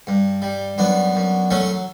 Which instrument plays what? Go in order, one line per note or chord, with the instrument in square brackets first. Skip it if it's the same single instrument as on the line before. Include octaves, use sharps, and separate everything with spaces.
[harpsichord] G2
G3
F#2 B3 D4
F#2
F#3 A3 C#4